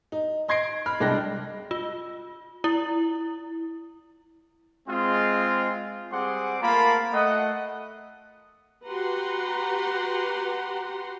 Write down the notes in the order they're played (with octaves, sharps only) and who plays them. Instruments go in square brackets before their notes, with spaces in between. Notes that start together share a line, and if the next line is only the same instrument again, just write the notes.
[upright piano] D#4
D#5 C6 G#6 A#6 C7 D7
B5 F6
C2 G#3 D4 G5 F#6 A#6
[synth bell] F4
E4
[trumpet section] G#3 C4 F4
G3 C4 G#4 F#5 C6 D6
A3 A#3 F4 A#4 A5 B5
A3 D#5 F#5
[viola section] F#4 G4 B4 F#5 A#5 C6